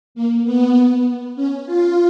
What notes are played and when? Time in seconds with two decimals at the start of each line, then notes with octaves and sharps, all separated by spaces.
0.15 A#3
0.45 B3
1.36 C#4
1.66 F4